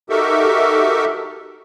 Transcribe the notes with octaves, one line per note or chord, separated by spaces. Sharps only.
D#4 F#4 G4 A4 A#4 E5